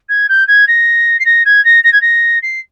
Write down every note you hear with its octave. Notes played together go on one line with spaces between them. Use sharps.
G#6
G6
G#6
A#6
C7
A#6
G#6
A#6
A#6
G#6
A#6
C7